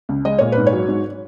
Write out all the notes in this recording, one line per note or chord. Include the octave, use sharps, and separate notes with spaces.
C#2
G#3 D#5
A#2 C#5
B4
G#2
C#5
F#3
G#2